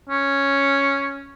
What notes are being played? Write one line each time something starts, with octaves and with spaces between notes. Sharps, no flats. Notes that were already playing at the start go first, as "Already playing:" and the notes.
C#4